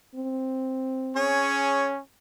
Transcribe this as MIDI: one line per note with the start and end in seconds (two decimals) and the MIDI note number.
0.15 1.46 60
1.16 2.00 61
1.16 1.93 68
1.16 1.93 73